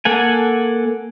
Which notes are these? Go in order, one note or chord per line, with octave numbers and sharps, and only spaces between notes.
A#3 A4 F#5 G#5